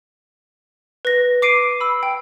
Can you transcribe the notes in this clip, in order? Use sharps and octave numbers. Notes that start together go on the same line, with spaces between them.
B4 A#6
D6 C7 D7 D#7
B5 E6
G5